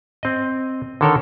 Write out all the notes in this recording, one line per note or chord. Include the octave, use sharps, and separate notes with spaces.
C4 D#5
D3 D#3 A4 A#4 C#5